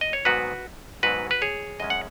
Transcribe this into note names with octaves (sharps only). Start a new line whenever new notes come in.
D#5
C#5
G#2 D#3 F#3 B3 F#4 B4
G#2 D#3 F#3 B3 F#4 B4
B4
G#4 C#5
F#2 C#3 G#3 C#4 D#5
F#5